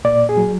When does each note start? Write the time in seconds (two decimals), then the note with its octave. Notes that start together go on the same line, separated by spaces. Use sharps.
0.05 A#2 D5
0.29 G#4
0.37 F#3